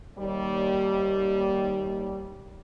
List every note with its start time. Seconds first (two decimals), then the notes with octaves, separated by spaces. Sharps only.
0.18 D#2 G3